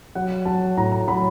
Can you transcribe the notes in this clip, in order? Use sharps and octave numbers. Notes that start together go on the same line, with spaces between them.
F#3 F#5
F#3 A5
A2 A#5
A#5
F#3 B5